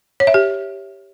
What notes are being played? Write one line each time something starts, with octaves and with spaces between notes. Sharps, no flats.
C#5
E5
G4